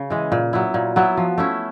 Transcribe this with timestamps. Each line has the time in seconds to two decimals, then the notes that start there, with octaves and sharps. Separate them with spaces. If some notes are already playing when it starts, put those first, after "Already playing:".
Already playing: C#3
0.10 E3 G#3
0.32 A#2
0.53 F#3 B3 E4
0.74 A#2
0.96 F#3 B3 E4
1.17 F3
1.38 A3 C#4 E4